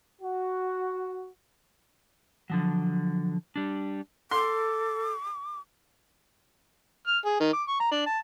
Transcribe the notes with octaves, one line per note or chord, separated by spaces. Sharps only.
F#4
D3 F3 F#3
G3 D4
A4 C6 D6
F6
G#4
D#3
D6
C#6
A#5
D4
A5